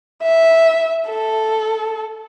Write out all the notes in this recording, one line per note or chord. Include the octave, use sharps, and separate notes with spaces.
E5
A4